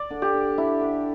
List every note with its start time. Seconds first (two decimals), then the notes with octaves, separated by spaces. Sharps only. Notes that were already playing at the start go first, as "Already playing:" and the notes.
Already playing: D5
0.11 D3
0.22 G4
0.34 D3
0.58 D4 E4
0.81 D3